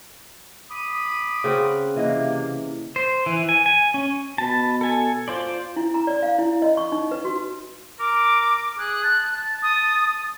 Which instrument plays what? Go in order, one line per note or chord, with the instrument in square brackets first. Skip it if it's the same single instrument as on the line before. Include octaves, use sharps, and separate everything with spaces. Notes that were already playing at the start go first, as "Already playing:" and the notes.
[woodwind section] B5 D6 D#6
[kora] C#3 C4 F#4
[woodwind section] C3 A#3 [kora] E3 D#5
[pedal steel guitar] C5
E3
G#5
G#5
C#4
[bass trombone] B2 [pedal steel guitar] B4 A5
[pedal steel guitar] A4 G#5
F4 C5 D5
[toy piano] E4
A#5
D5
F5
E4
D#5
C#6
D#4
B4
F#4
[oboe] A#4 [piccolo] D6
[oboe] G#4 [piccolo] F#6
[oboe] A5
[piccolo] D#6